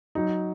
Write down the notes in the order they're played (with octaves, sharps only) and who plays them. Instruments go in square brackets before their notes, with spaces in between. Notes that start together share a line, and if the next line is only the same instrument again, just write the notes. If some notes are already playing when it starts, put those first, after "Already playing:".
[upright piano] F#3 D#4